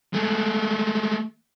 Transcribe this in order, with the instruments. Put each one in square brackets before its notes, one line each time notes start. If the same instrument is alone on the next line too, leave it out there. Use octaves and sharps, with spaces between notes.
[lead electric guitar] G#3 A3